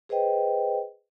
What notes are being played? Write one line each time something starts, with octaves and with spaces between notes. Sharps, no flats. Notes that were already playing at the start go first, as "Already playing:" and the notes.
G#4 B4 C5 D#5 G5